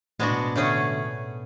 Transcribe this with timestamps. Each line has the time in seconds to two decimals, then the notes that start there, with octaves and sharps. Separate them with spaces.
0.19 A2 G#3 B3 D4 F#4
0.31 B2
0.55 D3 A3 C#4 G#4